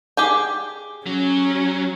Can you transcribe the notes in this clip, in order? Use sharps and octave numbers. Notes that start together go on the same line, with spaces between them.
G4 G#4 G5
F#3 C#4